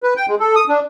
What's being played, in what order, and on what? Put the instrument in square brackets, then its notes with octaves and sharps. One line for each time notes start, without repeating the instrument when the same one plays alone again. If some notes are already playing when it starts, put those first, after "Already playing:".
[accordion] B4
G5
G#3
A4
D#6
D4